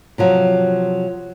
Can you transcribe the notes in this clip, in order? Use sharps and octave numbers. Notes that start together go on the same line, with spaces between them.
C3 F3 F#3